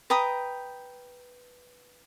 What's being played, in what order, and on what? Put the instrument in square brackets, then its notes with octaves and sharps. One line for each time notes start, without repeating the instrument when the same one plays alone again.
[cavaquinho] B4 G5 A#5 D#6